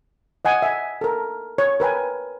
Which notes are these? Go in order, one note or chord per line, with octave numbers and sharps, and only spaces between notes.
D#5 F#5 G#5 D#6
E5 G#5
A4 A#4
C#5
A#4 B4 G5 G#5